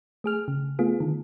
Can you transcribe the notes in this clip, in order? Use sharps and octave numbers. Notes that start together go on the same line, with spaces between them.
A3 G#4 F6
C#3
A3 B3 F4 G#4
D3 D#3